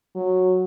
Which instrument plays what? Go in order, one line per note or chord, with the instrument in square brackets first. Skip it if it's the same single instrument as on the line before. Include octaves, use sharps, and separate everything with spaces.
[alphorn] F#3